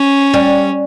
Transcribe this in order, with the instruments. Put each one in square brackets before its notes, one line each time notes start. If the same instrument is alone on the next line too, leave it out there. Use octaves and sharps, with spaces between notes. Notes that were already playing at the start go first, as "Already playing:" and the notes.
Already playing: [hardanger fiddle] C#4
[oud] G3